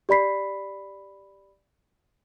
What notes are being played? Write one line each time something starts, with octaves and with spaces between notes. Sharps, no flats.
G4 D5 B5 B6 C7